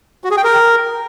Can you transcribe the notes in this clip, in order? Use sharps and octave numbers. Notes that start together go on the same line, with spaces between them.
F#4
G#4
G5
A#4